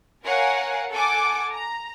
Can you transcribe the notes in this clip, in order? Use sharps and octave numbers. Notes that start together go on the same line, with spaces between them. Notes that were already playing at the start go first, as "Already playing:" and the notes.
A#4 C#5 F5 F#5 G#5
A4 F#5 G#5 D6
A#5